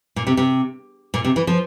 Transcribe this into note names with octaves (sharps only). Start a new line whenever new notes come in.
A#2
C3
C3
A#2
C3
E3
F3